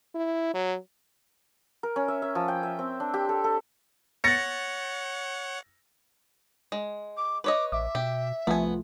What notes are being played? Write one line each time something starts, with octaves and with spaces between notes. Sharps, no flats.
E4
F#3
A#4
C#4
E5
E5
F3
G5
E5
C4
D4
G4
A4
A4
C#5 F#5 A6 A#6 C#7
G#3
D6
B4 C#5 D#5 D6
A#1 E5 D6
B2 G4
C2 F3 A3 B3 F4 G#5